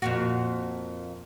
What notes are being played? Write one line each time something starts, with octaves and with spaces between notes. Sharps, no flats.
F2 A#2 F#4